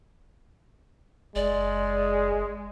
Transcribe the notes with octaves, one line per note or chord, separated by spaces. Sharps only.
F#1 G#3 D5